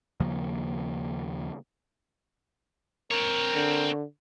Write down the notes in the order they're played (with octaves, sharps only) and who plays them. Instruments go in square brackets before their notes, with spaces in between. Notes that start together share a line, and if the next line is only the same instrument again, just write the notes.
[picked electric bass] D#2 C#3 F3 A#3
[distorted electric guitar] C4 C#5 [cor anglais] A#4
[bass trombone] D3